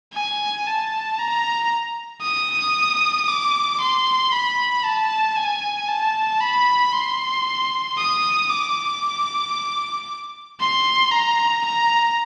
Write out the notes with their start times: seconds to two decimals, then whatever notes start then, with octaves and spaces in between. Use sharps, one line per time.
0.13 G#5
0.66 A5
1.19 A#5
2.22 D#6
3.28 D6
3.80 C6
4.32 B5
4.84 A5
5.37 G#5
5.88 A5
6.41 B5
6.93 C6
7.97 D#6
8.50 D6
10.60 C6
11.11 A#5
11.65 A#5